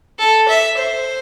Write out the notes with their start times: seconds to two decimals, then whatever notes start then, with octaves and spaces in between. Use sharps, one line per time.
0.19 A4
0.48 E5
0.78 C5